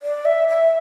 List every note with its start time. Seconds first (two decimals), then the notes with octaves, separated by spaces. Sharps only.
0.02 D5
0.25 E5
0.48 E5